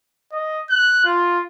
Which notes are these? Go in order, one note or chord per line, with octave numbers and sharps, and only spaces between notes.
D#5
F#6
F4